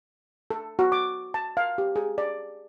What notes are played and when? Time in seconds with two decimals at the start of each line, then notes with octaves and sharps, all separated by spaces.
0.51 A4
0.79 F#4
0.92 D6
1.34 A5
1.57 F5
1.78 G4
1.96 G#4
2.18 D5